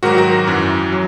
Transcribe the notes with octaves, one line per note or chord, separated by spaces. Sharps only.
G#2 D#3 F#3 F#4 A#4
F#4 A#4
F#2 E3
F#3